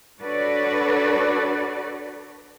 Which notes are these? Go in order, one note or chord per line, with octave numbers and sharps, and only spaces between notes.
D4 F#4 A4 B4 C#5 D5